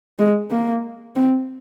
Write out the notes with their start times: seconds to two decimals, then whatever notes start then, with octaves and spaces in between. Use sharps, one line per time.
0.19 G#3
0.51 A#3
1.15 C4